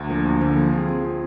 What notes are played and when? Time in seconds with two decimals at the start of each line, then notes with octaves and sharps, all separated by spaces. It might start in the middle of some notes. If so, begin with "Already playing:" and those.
Already playing: D2
0.10 D3 F3 A#3
0.25 D2
0.42 D3 F3 A#3
0.57 F3
0.73 C4 F4 G#4
0.89 F3
1.04 C4 F4 G#4